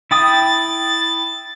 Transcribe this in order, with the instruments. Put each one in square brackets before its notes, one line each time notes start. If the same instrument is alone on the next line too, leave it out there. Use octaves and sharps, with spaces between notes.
[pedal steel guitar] E4 G5 D#6 [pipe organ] A6